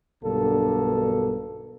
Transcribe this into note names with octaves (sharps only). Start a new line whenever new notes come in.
B1 G2 B2 D3 A#3 A4